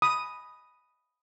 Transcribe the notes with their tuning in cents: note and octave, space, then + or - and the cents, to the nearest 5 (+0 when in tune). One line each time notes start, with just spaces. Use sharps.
B5 +0 D#6 +0